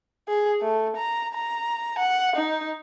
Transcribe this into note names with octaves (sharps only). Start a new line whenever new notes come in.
G#4
A3
A#5
A#5
F#5
D#4